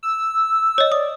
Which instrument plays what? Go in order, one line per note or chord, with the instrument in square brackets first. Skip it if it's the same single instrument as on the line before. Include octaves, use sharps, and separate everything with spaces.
[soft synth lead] E6
[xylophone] C#5 D#5
[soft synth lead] D5 [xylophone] D#6